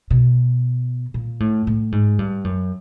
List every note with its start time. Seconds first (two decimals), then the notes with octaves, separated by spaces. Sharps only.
0.10 B2
1.14 A#2
1.40 A2
1.67 A2
1.92 G#2
2.19 G2
2.44 F#2